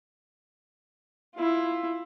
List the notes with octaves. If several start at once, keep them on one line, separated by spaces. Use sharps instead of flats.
E4 F4